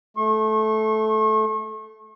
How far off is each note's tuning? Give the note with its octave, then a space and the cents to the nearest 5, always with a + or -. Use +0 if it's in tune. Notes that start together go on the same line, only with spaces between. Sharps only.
A3 -15 C#6 -40